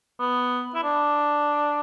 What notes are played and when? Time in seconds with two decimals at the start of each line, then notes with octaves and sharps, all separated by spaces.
0.20 B3
0.75 E4
0.84 D4